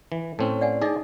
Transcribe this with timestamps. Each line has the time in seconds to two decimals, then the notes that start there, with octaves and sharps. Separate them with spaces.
0.12 E3
0.39 A2 C4 C#4 A5
0.61 D5 F#5 G#5
0.82 D4 D#4 G#4 D5 D#5